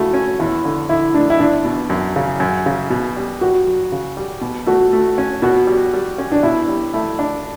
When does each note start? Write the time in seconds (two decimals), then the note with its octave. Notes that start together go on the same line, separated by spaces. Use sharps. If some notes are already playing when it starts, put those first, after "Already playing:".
Already playing: C#3 A3 E4 F#4
0.14 C#4
0.39 E2 E4
0.65 D3
0.89 D3 E4
1.14 A3 D4
1.30 E4
1.39 E2 D4
1.64 B2
1.90 F#2
2.16 C#3
2.40 F#2
2.66 C#3
2.90 B2
3.16 G3
3.41 G2 F#4
3.67 F#3
3.92 C#3
4.17 G3
4.41 B2
4.66 A3 F#4
4.93 A3
5.18 C#4
5.42 B2 F#4
5.67 G3
5.93 G3
6.18 C#4
6.32 D4
6.43 B2 E4
6.68 G3
6.94 A3 E4
7.19 D4